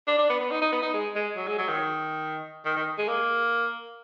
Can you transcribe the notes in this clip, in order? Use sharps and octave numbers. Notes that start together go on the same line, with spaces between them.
D4
D4
B3
B3
D#4
D#4
B3
D#4
G#3
G#3
F#3
G#3
F#3
D#3
D#3
D#3
G#3
A#3